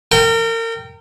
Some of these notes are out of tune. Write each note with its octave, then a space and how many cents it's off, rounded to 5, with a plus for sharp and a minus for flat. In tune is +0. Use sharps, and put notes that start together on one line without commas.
A#4 -35 G5 -5